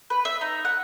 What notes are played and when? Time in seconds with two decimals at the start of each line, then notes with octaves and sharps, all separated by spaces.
0.10 B4
0.25 E5
0.41 D#4
0.65 F#5